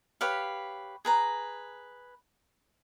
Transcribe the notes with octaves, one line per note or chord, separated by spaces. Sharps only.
G4 B4 C#5 F5
G#4 B4 A#5